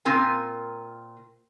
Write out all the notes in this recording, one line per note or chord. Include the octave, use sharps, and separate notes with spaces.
A#2 C4 F4 A#4 G#5